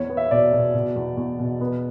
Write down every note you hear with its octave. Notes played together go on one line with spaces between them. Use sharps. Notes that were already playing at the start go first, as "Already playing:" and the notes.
Already playing: E2 C#5
B3
E5
B2 D5
B2
B2
E2
E2
B2
B3